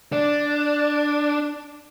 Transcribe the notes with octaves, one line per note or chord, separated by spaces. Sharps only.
D4 D5